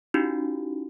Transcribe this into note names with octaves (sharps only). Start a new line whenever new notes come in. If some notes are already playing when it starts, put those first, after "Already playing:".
C#4 D#4 E4 F#4 G4